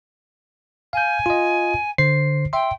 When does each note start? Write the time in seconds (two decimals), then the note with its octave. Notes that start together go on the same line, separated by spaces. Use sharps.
0.93 F5 G#5 G6
1.26 F4 D#5
1.98 D3 C5 C7
2.53 E5 G5 C6